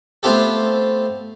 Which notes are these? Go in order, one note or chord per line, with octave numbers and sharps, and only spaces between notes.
A3 B3 C4 F4 G4 A4